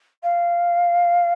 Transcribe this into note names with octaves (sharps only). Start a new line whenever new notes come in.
F5